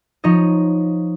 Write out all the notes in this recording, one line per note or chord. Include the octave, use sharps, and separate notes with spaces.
F3 D#4 C#5 D#5